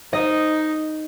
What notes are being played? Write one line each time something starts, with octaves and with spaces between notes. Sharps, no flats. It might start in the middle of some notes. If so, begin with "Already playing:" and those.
D#4 D#5